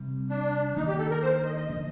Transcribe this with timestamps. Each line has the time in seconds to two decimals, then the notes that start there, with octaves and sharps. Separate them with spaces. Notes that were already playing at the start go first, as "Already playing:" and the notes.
Already playing: C3 G3 C4
0.30 D4
0.76 D#3 A#3 D4 D#4
0.88 G4
0.99 A4
1.11 A#4
1.22 C5
1.45 D#5
1.57 D#5
1.68 D3 F3 A#3 D#5